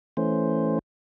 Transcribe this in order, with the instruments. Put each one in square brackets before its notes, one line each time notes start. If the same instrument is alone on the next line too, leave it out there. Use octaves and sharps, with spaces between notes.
[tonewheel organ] E3 A3 C#4 C5